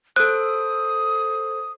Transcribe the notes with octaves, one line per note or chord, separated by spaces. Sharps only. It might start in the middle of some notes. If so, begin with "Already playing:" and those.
A4 C5 D#6 F#6